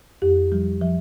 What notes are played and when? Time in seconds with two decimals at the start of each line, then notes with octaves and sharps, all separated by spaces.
0.22 F2 G4
0.52 F3 G3
0.81 F3